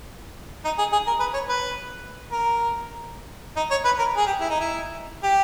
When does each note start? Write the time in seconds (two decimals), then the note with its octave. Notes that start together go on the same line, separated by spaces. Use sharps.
0.65 D#4
0.78 G#4
0.93 G#4
1.07 A#4
1.20 B4
1.34 C#5
1.49 B4
2.32 A#4
3.57 D#4
3.71 C#5
3.85 B4
3.98 A#4
4.17 G#4
4.26 G4
4.40 E4
4.50 D#4
4.60 E4
5.23 G4